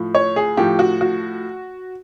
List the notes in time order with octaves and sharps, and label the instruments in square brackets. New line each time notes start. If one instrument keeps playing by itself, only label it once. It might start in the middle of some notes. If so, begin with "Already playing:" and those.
Already playing: [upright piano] A2 F3
C#5
G#4
A2 F3 G4
F#4
F#4